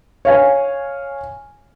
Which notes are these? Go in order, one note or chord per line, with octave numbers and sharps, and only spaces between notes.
C#5 F5 G#5